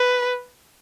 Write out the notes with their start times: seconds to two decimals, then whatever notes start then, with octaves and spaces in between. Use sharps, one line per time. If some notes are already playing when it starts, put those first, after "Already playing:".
Already playing: B4